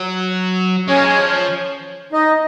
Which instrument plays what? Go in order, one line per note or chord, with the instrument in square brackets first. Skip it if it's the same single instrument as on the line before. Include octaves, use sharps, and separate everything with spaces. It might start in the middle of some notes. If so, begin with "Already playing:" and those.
Already playing: [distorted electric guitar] F#3
[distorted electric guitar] G#3 [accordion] C#4 C#5
[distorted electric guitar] A#3
G#3
F3
[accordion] D#4 D#5